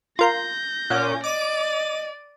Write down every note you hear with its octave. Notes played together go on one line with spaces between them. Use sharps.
F4 A#4 C6 G6 A#6
A#2 C#4 C#5 F#5 D6
D5 D#5 D6 D#7